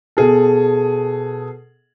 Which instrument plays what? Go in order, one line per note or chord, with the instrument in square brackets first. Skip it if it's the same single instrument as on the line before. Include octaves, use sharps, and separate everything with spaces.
[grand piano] B2 G#4 A4